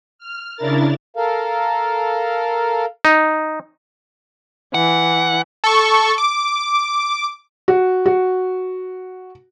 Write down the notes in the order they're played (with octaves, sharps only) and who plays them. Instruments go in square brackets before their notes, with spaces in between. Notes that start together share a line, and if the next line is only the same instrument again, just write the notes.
[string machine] F6
C#3 D4 E4 A#4 A6
[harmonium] A4 A#4 F5
[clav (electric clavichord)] D#4
[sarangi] E3 [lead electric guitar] F#5
[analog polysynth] A4 C#6
D6
[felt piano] F#4
F#4